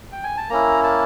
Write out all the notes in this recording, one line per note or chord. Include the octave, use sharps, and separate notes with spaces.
G5
G#5
A5
A#3 C#4 E4 A#5
A5